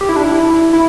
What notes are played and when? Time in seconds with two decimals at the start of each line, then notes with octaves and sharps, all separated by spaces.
0.01 G4
0.09 E4
0.16 D4
0.25 E4
0.73 E4